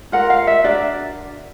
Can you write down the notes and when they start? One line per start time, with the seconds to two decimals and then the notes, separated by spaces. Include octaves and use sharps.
0.12 F4 A#4 F#5
0.30 F5
0.47 E5
0.64 D4 F#4 A#4 D5